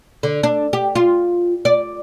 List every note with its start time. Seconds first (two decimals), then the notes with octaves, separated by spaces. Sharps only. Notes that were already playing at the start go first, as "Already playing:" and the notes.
0.23 D3
0.43 D4
0.73 G4
0.95 F4
1.65 D5